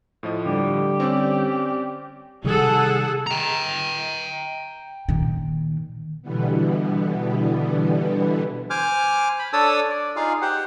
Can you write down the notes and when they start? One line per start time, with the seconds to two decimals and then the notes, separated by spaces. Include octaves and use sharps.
0.23 A2 F3 D#5
0.46 D3 G3 G4
1.00 C4 C#4 D5
2.44 C3 D#3 G3 G#4 A4 F#5
3.27 G5 A#5
5.09 A#2 D#3
6.22 B2 D3 E3 G3 B3
8.70 C5 G#5 D6 F6
9.39 B5
9.53 D4 A4 C#5 A5 D#6 E6
9.90 D5
10.16 D#4 F4 G#4 F5
10.42 G4 C5 F#5